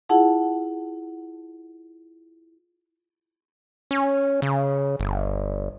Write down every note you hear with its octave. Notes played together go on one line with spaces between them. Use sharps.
E4 F4 G#4 F#5 A5
C#4
C#3
G1